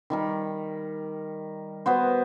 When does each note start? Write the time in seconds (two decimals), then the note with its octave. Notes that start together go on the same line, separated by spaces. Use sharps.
0.10 D#3 G3 A#4
1.86 B3 F#4 C5